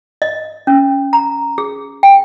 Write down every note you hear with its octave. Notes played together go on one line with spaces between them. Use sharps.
D#5
C#4
A#5
G#4
G5